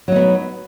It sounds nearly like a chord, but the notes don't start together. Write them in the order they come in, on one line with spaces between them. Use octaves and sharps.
F#3 D#4 B3